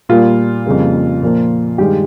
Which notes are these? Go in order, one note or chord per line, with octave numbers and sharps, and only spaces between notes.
A#2 G3 A#3 F4
F2 C#3 G3 A#3
A#2 F3 A#3
G2 D#3 G#3 G4